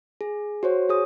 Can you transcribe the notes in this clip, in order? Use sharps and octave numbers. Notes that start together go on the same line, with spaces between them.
G#4
F#4 C5 C#5
G#4 C#5 D#6